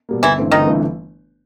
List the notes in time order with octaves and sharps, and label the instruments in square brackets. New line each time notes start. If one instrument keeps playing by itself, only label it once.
[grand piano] B2 G3 A#3
[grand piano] G1 [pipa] E3 E4
[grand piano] G2 E3 A3 C4
[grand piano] G1 [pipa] D#3 D#4
[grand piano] G2 E3 A3 C4